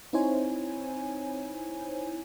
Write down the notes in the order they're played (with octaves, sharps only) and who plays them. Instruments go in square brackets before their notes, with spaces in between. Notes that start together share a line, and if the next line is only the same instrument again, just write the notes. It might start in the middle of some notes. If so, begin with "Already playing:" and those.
[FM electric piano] C4 D#4 E4 C5 C#5 G#5